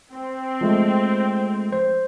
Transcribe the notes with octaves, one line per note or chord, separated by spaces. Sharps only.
C4
F3 G#3 A3
C5